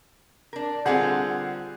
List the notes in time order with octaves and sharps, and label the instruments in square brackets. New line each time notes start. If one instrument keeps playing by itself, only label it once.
[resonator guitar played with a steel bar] D4 A#4
[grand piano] D3 G#4 F#5 [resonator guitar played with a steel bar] G3 C4 F4